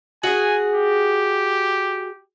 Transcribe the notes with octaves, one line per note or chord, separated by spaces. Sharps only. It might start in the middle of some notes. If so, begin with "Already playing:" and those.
F#4 G#4 G#5
G4